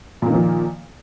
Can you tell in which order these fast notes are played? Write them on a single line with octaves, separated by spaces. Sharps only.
A#2 A#3 D#3 F3